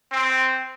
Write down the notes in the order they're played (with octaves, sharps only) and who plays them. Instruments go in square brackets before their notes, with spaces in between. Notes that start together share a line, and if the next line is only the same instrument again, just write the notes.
[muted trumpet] C4